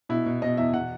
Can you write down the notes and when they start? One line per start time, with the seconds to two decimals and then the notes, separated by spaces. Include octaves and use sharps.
0.09 B2 E4
0.26 B2
0.42 B2 D#5
0.57 E2 E5
0.74 B2 F#5